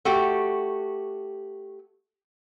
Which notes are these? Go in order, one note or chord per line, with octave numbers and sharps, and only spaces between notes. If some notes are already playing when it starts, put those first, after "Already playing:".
A3 F#4 G4